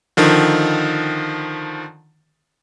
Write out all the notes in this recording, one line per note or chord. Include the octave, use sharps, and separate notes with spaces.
D3 D#3 F3